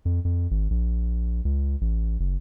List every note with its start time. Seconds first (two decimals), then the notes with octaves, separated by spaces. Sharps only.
0.05 F2
0.25 F2
0.51 G#1
0.70 A#1
1.45 C#2
1.81 A1
2.20 F#1